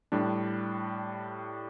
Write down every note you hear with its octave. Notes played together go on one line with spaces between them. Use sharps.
A2 G3 D4